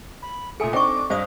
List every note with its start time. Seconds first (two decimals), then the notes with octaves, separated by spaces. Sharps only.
0.22 B5
0.60 A#2 A4 E5 G#5 D#6 C#7
0.73 C4 D4 D#4 G5 C#6 D6
1.10 G2 C5 D5 D#5 F5 D#6